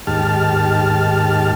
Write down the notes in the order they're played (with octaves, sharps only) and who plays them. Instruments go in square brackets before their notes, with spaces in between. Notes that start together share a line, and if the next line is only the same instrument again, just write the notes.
[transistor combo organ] D#2 G#2 G4 A5 F6